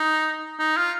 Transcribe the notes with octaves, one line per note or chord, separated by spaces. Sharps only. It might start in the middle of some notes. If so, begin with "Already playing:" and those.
Already playing: D#4
D#4
F4